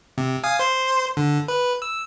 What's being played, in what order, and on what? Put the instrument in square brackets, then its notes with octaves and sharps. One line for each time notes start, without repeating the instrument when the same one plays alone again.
[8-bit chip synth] C3
F5 G#5 D#6
C5 C6
D3
B4
E6